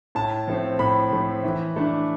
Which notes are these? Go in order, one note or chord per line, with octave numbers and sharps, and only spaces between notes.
A2 A5
F3 A3 C4
A2 B5
F3 A3 C4
E3
A3 D4